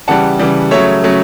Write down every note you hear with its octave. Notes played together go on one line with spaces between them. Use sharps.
C#3 E3 G3 F#5 A5
C#3 E3 G3
C#3 F#3 A3 C#5 E5
C#3 F#3 A3